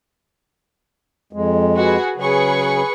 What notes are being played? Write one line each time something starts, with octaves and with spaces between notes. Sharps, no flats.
F2 G#3
F#4 G#4 B4
C#3 F#3 G#4 B4 C#6